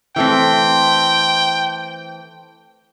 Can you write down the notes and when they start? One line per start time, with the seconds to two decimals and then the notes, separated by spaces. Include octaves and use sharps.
0.16 E3 A3 C4 G5